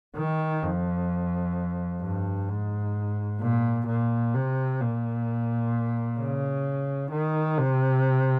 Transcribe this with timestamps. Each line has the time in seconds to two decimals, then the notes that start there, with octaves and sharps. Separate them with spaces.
0.17 D#3
0.63 F2
2.02 G2
2.49 G#2
3.41 A#2
3.87 A#2
4.34 C3
4.81 A#2
6.19 C#3
7.11 D#3
7.58 C3